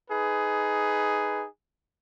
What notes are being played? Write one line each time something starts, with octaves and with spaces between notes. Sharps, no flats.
D#4 G#4 B4